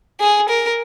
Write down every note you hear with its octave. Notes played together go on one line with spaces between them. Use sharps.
G#4
A#4